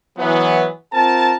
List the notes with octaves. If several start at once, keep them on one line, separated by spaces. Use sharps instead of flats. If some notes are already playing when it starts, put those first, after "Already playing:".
E3 F#3 B3
C4 F4 A#4 A5